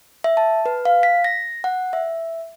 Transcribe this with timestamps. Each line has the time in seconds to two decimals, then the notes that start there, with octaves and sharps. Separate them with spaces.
0.24 E5
0.37 A5
0.66 B4
0.85 F5
1.03 B6
1.24 A#6
1.64 F#5
1.93 E5